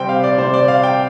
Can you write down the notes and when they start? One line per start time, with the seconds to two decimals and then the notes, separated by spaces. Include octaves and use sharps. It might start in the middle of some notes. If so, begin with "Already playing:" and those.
Already playing: C3 G3 C5 G5
0.09 F5
0.23 D5
0.38 C3 G3 C5
0.54 D5
0.68 F5
0.83 G5